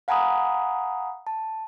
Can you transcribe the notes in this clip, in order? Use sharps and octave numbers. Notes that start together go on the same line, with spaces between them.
F5 F#5 G#5 A#5 B5 D#6
A5